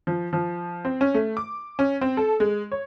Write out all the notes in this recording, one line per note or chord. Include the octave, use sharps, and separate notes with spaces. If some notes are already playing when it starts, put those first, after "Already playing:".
F3
F3
C4
C#4
A3
D6
C#4
C4
A4
G#3
C#5